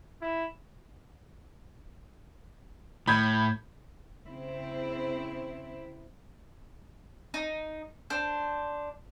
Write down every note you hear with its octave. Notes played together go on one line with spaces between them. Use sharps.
E4
A2 B5 G6 G#6
C#3 C4 E4
D#4
D4 C5